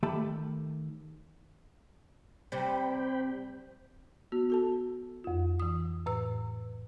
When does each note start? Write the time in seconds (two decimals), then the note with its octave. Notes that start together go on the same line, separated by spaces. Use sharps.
0.03 D#3 A3 G4 A5 B5
2.52 C3 G3 C5 G5 B5
4.32 B3 F#4
4.50 F#4 A4 A5
5.24 F2 F4
5.60 E3 D#6
6.06 A2 B4 E6